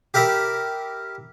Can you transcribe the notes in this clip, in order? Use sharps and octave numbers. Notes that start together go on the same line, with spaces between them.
G4 A#4 E5 B5